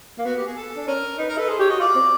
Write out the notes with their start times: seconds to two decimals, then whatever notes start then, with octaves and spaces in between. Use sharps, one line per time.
0.18 A#3
0.25 B3 F#4
0.37 G4
0.46 G#4
0.57 A4
0.77 D4
0.87 C#4 A#4
1.18 D#4 B4
1.29 A#4
1.38 A4 B4
1.49 G#4 C5
1.59 G4 C#5
1.70 F#4 D#5
1.81 F4 D5
1.95 C4